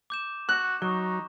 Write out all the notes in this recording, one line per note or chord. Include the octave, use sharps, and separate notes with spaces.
D6 G6 E7
F#4 F#6
F#3 D#4 C#6